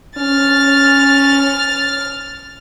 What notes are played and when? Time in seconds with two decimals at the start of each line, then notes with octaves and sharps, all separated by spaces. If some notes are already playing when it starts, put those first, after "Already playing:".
0.18 C#4 F6 A6